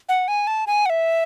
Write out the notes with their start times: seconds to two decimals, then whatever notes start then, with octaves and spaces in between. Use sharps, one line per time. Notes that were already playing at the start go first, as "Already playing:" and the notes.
0.09 F#5
0.28 G#5
0.47 A5
0.67 G#5
0.86 F#5
0.90 E5